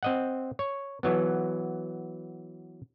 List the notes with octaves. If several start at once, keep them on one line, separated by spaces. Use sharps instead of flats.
C4 D#5 F#5
C#5
E3 F#3 B3